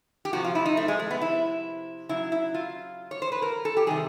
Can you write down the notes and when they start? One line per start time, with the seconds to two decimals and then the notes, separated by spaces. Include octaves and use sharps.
0.25 G4
0.33 C3 F3 F#4
0.44 F4
0.55 E4
0.65 D#4
0.77 A3
0.88 G#3
0.99 A3
1.11 B3
1.21 E4
2.09 C#3 F#3 E4
2.32 E4
2.54 F4
3.11 C#5
3.22 C5
3.32 B4
3.42 A#4
3.65 A4
3.77 G4
3.86 C3 D#3 G3 G#4